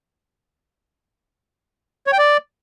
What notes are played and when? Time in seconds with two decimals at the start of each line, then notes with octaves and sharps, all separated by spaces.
2.07 C#5
2.13 G5
2.18 D5